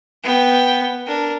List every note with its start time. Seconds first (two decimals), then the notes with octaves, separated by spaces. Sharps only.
0.23 B3 G5
1.07 D4 A#4